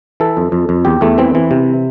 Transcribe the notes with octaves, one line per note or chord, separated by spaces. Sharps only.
E3 A4
F2
F2
F2
E2 G4
E2 A3
E3 C4
E3
C3